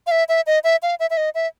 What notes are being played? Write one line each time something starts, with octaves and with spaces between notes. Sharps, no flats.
F5
E5
E5
D#5
E5
F5
E5
E5
D#5
E5